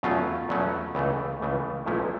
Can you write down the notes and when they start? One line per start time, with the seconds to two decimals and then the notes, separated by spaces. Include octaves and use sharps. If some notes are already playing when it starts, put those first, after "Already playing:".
0.03 E2 B2 F#3 A3 C#4 F4
0.49 E2 B2 F#3 A3 C#4
0.95 C#2 C#3 E3 A3
1.40 C#2 C#3 E3 A3
1.85 B1 A#2 F3 A3 C#4 E4